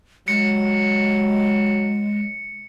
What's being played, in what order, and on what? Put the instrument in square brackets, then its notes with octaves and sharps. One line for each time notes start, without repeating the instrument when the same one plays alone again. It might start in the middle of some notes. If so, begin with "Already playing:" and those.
[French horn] F#3 [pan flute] G#3 [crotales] C#7